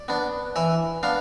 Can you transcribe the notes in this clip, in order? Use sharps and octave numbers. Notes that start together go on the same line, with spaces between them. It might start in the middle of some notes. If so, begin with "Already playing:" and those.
Already playing: D5
B3 D4
E3 E5
B3 D4 F5